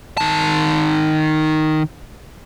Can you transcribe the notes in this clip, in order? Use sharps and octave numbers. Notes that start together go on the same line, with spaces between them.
D#3 A5